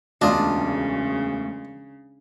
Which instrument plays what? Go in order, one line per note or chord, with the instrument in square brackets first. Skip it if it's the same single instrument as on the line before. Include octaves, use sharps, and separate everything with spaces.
[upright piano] E1 D2 [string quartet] C#3 [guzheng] D4 [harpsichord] F4 D5 D#5